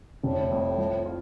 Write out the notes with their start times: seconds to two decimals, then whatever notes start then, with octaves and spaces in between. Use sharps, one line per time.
0.23 F1 A2
0.51 F2
0.78 F3
1.06 F4